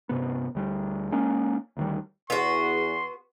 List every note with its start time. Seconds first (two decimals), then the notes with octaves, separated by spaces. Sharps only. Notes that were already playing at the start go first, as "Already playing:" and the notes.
0.09 G2 C3 B3
0.55 D2 G3
1.12 G#3 A#3 C#4
1.77 D2 D#3 G3
2.30 E2 B3 F#4 C6